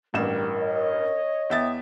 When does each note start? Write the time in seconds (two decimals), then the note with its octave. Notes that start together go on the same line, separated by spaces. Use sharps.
0.14 A1 D2 G2 G3 A#3 A#4 E7
0.57 C#5 D#5
1.50 E2 E5 G5 D#6 A6